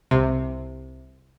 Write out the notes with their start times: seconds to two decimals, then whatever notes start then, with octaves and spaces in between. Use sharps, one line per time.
0.11 C2 C3